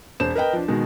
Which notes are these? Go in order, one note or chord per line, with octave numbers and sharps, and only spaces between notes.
E1 C5 E7
A#4 B4 D#5 G5
F3 D4
B2 D#3 G#3